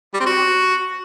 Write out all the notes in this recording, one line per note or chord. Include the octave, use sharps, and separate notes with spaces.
G3
C4
F#4